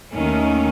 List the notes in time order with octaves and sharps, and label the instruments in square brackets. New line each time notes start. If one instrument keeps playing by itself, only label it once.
[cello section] D#2 D#3 A3 C#4